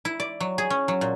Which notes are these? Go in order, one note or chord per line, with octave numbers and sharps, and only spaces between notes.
E4
D5
F#3
G#4
C#4
F#3
A#2